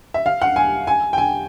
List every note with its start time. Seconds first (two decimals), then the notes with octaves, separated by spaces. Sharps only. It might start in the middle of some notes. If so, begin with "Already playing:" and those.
0.14 E5
0.26 F5
0.42 F#5
0.56 G#5
0.87 G#5
1.13 G5
1.18 G#5